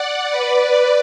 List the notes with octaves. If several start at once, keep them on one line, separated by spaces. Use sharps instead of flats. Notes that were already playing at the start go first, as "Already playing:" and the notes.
Already playing: D5 F#5
B4 D5